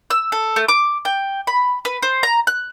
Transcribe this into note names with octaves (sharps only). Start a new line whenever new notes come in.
E6
A4
A3
D6
G5
B5
B4
C5
A#5
F#6